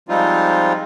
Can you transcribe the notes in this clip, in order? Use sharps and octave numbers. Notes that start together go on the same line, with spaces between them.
F3 G3 G#3 C4 D#4 F4